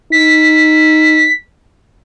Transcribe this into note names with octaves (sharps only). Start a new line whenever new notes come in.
D#4 B6